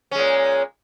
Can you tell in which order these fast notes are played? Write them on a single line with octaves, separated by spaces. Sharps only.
C#4 G#3 A#2